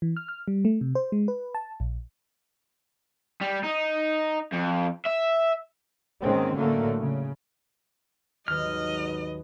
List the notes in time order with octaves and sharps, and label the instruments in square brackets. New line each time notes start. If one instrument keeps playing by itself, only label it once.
[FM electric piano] E3
F6
F6
G3
A3
C3
C5
G#3
B4
A5
A#1
[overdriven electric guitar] G3
D#4
F2
E5
[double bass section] G#2 D#3 G#3 A#3 C4 C#4
A2 D3 F#3 A3 A#3
C#3
[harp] D#1 D#2 [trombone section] G#2 F#3 B4 [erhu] D#5 [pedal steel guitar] F6